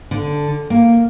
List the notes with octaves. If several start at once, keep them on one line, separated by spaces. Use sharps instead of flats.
D3
A#3